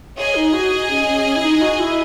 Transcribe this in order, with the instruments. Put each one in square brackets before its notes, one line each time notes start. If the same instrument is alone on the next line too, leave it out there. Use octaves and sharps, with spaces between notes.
[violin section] G#4 D#5 G#5 [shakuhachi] C#5
[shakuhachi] D#4
F#4
C#4
C#4
C#4
E4
D#4
F#4
E4